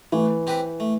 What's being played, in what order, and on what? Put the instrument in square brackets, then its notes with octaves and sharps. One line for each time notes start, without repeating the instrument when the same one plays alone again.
[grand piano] E3 [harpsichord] A3
[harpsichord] C4 G4 B4
A3